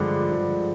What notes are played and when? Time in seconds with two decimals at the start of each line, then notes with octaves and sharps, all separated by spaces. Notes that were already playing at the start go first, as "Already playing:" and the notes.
Already playing: G2 D3 F3 G#3
0.30 G2 D3 F3 G#3